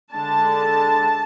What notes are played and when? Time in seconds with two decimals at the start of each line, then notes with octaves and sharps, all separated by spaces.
0.12 D3 G#3 D4 A5